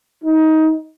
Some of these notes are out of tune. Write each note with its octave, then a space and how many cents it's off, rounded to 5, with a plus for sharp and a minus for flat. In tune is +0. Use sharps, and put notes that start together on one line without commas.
D#4 +20